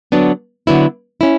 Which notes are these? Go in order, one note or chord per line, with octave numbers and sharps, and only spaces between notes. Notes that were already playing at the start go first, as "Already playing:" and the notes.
D3 F#3 B3 D4
D3 F#3 B3 E4
C#4 E4